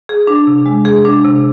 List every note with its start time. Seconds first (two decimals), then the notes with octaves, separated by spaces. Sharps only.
0.09 G#4
0.27 D4
0.47 C3
0.66 G#3
0.85 G#4
1.05 D4
1.24 C3